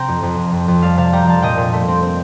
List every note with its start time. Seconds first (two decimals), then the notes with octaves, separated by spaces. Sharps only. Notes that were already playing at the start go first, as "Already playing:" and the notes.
Already playing: C3 C4 G5 A#5
0.08 F2
0.23 F2
0.38 F2
0.53 F2
0.68 F2
0.82 G3 F5 A5
0.97 C3 F5 A5
1.13 G3 G5 A#5
1.25 F2 F5 A5
1.42 A#2 D#5 G5
1.57 A#2
1.73 A3
1.88 C4
2.02 C4